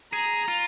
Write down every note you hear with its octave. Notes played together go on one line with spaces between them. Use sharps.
G#4 A#5
F4